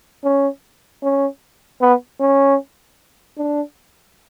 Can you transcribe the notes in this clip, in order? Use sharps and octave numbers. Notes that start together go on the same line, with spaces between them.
C#4
C#4
B3
C#4
D4